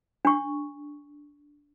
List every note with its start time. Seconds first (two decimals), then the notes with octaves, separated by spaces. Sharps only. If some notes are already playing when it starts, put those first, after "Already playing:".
0.25 D4 C#6